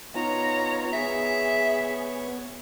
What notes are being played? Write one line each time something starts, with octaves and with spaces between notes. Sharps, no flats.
B3 D#4 F4 C#5 A#5
B3 G#4 C#5 E5